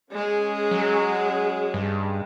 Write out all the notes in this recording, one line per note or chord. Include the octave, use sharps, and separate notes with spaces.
G#3 C#4 G#4
F#3
G2